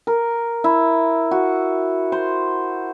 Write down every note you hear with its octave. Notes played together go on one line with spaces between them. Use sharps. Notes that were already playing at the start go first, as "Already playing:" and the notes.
A#4
E4
F#4
C5